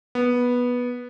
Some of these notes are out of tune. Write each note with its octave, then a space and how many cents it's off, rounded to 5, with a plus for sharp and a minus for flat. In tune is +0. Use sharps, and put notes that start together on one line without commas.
B3 -10